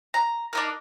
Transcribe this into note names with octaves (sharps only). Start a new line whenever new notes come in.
A#5
D4 D#4 A#4